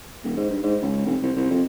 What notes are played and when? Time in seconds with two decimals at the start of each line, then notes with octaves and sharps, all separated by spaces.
0.23 D#1
0.37 G#2
0.50 G2
0.62 G#2
0.82 C#2
1.06 F1
1.22 C2
1.36 C2
1.51 F2